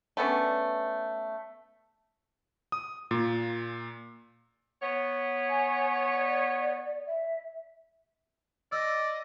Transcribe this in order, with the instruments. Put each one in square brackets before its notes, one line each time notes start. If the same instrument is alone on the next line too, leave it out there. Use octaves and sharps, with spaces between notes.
[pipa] A3 B3 C#4 D4
[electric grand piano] D#6
A#2
[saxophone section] B3 C#5
[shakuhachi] G#5
D5
E5
[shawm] D5 [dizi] D#5 [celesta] E6